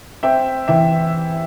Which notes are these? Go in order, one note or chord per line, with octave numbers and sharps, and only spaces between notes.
C4 E5 G5
E3 E5 G5